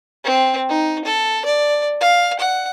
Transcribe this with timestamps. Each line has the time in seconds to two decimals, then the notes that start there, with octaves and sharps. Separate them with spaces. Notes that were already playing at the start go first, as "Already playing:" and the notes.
0.24 C4
0.69 D#4
1.05 A4
1.45 D5
2.01 F5
2.39 F#5